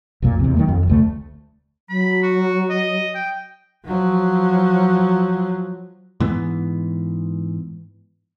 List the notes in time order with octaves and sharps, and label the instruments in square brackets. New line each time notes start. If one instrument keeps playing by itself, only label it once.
[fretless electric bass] B1 F2 A#2
E2 C3
D#3 F#3 G#3 A#3
F2
F1 D2 A3
[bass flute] F#3 [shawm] B5
[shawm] F#4
D#5
G5
[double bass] F3 F#3
[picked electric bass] G#2 E3 B3